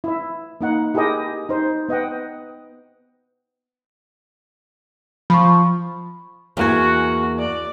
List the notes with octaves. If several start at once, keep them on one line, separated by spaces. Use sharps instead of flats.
E4 E5
A#3 D#4 F#5
E4 G4 G#4 A#4 D#5 G5
D#4 C5
B3 D#5 F#5 G5
F3 B5 C#6
E2 A#3 F#4 G#5
D5